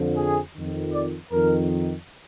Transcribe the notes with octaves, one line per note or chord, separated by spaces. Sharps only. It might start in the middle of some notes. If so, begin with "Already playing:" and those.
Already playing: F2 D3 F3
G#4
F2 D#3
D5
F2 D#3 A#4